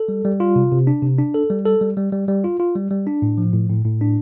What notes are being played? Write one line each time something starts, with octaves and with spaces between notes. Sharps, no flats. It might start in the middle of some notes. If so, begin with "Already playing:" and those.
Already playing: A4
G3
G3
F4
C3
C3
D4
C3
D4
A4
G3
A4
G3
G3
G3
G3
F4
F4
G3
G3
D4
A2
F3
A2
A2
A2
D4